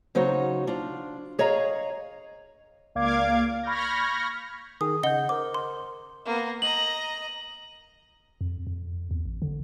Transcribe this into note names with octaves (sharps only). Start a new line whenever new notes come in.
C#3 F#3 D#4 F#4 C5 C#5
D4 F4
G#4 C#5 D#5 F5 A#5
C#2 A#3 D5 F5 D6 G#6
B5 C#6 F6 G6 G#6 A#6
D#3 G#4 D#6
C#3 D#5 F#5 G6 G7
A#4 C5 D6
C6
A#3 B3
D#5 A#5 F#7
F2
F2
E2
A1
D3